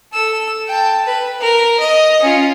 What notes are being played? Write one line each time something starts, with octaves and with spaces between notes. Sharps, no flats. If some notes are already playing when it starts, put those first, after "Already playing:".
A4 E6
G5 A5
B4
A#4
D#5
C#4 F4